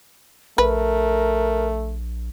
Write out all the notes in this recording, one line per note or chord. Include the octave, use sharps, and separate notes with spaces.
A#1 A3 A#4 B4